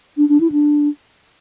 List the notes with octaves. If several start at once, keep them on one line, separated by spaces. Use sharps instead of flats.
D4
D4
E4
D4